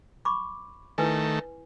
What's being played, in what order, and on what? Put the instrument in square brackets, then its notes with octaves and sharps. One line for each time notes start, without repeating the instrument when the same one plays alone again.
[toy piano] B5 C#6 D6
[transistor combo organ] D#3 A3 [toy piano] E4 B4 G#5